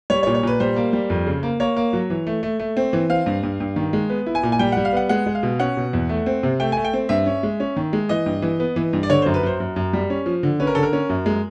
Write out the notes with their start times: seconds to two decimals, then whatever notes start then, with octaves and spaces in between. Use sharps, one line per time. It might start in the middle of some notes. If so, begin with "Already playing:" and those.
0.10 G3 C#5
0.23 C#5
0.27 A#2
0.35 C#5
0.43 A#2 B4
0.60 G3 C5
0.76 A#3
0.93 G3
1.10 F2
1.27 C#3
1.43 A#3
1.60 A#3 C#5
1.77 A#3
1.93 F#3
2.10 E3
2.27 A3
2.43 A3
2.59 A3
2.77 C4
2.93 E3
3.10 C4 F5
3.26 G2
3.43 G2
3.60 G2
3.76 D#3
3.93 G#3
4.10 B3
4.26 E4
4.35 G#5
4.43 A#2
4.52 G#5
4.59 G3 G5
4.72 G3 F#5
4.85 F5
4.93 B3 F#5
5.09 G#3 F#5
5.26 G#3
5.35 F5
5.43 B2
5.60 C#4 F#5
5.77 B2
5.93 E2
6.09 A3
6.26 C4
6.43 C3
6.60 A3 G5
6.72 A3 G#5
6.85 G5
6.93 C4
7.09 G2 E5
7.26 C#4
7.43 G#3
7.60 C#4
7.77 D#3
7.93 G#3
8.09 E3 D#5
8.26 G2
8.42 E3
8.60 B3
8.76 E3
8.93 G2
9.03 D5
9.10 D3 C#5
9.22 F#2 C5
9.34 B4
9.43 F#2 C5
9.60 F#2
9.76 F#2
9.93 G3
10.10 C#4
10.26 F3
10.43 D3
10.60 C#4 B4
10.67 A#4
10.75 D3 A4
10.83 A#4
10.93 C#4
11.09 F#2
11.26 G#3